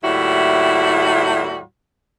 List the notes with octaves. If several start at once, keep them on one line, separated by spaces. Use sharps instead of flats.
D#2 A2 G3 E4 F#4